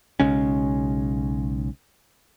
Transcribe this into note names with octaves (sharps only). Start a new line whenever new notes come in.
B1 C#3 G#3 C#4